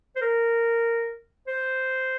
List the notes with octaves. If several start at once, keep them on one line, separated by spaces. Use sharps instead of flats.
C5
A#4
C5